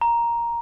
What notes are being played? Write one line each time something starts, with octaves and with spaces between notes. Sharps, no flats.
A#5